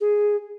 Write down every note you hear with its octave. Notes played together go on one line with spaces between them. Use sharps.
G#4